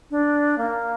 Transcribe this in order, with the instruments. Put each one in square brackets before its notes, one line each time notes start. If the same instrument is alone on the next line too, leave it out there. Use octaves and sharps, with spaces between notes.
[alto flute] D4
A#3